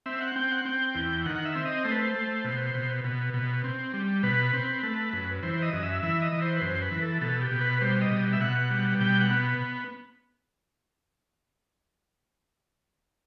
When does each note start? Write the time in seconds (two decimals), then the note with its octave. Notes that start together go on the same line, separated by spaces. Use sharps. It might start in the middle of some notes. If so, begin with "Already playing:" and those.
0.06 C4 E5
0.21 F#5
0.36 C4 G5
0.51 F#5
0.65 C4 G5
0.95 E2
1.25 D#3 F#5
1.36 F#5
1.45 E5
1.55 C4
1.65 D#5
1.84 A3 C5
1.92 B4
1.99 C5
2.14 A3
2.44 B2
2.75 B2
3.04 B2
3.34 B2
3.64 C4
3.94 G3
4.23 B2 B4
4.53 C4
4.83 A3
5.13 F#2
5.43 E3 C5
5.54 C5
5.62 D#5
5.73 F#2 D#5
5.83 E5
6.02 E3 E5
6.22 D#5
6.32 E3
6.41 C5
6.57 B4
6.61 F#2 C5
6.82 B4
6.91 E3
7.02 A4
7.21 B2 A4
7.41 G4
7.51 B2
7.61 B4
7.81 G3 C5
8.01 D#5
8.11 B2
8.33 E5
8.41 B2 F#5
8.70 G3
9.01 B2 G5
9.20 F#5
9.30 B3